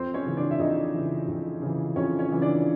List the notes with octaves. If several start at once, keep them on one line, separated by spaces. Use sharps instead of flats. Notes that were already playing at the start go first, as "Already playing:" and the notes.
Already playing: F2 C4 C5
C#4 C#5
C#3 E3
D4 D5
E5
F2 D#4 D#5
C#3 E3
F2
C#3 E3
F2 C#4 C#5
C#4 C#5
C#3 E3
D4 D5